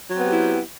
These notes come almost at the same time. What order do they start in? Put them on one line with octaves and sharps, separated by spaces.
F#3 C4 B3 G4 E4